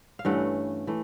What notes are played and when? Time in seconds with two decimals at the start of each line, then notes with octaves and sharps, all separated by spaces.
0.19 F5
0.25 G2 E3 A3 C#4 F#5
0.87 E3 A3